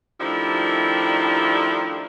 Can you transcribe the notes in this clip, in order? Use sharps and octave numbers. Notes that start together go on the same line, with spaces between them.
D#3 F3 G3 A3 D4 E4